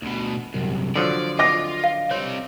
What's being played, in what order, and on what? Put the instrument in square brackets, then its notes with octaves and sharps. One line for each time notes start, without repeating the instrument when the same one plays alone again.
[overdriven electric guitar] D2 B2
C2 F#2
[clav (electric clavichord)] D3 F3 F#3 [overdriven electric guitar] D5
[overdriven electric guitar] F4 [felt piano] D#5 D6 A#6
[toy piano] F5
[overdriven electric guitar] G3 C4 [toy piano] C#5